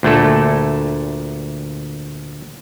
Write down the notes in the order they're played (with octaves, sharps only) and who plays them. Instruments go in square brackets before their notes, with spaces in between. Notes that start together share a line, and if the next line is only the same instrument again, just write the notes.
[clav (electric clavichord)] D2 A#2 A3 A4